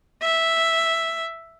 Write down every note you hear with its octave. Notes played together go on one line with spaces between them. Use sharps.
E5